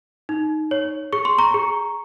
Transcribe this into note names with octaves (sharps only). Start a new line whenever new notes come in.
D#4
C#5
G#4 C#6
C6
A#5 C#6
G#4